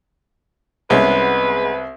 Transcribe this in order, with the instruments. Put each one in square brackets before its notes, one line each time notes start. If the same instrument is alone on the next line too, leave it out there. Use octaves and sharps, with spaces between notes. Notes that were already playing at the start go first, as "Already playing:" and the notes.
[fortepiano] C2 [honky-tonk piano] G#3 B3 C#4 [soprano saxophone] B4